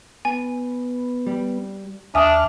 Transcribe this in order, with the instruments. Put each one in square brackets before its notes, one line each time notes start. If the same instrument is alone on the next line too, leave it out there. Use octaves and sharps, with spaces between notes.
[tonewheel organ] B3 [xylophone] G#5
[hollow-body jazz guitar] G3
[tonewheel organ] D#2 F6 [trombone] D4 [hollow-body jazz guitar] E5 [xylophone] G#5 D#6